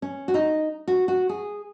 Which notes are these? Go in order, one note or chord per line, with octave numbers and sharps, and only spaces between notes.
C#4
F#4
D#4
F#4
F#4
G#4